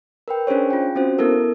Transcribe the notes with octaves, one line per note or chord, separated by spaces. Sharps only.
A#4 B4 G5
C#4 D4 G#4 C5 C#5
F4 G5
C4 C#4 F#4 C5
B3 E4 A4 A#4